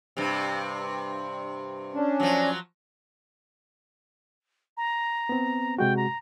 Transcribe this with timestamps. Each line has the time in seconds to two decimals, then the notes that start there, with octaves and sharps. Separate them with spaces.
0.17 G2 C3
1.94 C#4 D4
2.20 F3 F#3
4.77 A#5
5.29 B3 C4
5.79 C3 G#3 F#4 G5
5.97 A#5